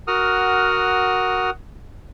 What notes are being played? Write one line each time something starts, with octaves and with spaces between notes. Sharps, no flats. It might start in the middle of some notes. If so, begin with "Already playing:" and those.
F#4 A#4 F#5 D#6 F6